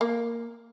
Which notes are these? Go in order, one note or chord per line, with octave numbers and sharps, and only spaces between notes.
A#3